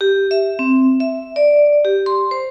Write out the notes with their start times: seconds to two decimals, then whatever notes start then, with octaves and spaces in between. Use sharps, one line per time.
0.01 G4
0.31 E5
0.59 C4
1.00 E5
1.36 D5
1.85 G4
2.06 C6
2.31 C5